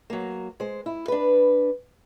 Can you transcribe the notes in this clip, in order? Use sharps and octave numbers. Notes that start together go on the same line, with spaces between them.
F#3 A#3
G#3 C5
E4
D4 B4